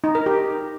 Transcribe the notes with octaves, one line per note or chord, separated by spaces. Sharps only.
D#4
A#4
G4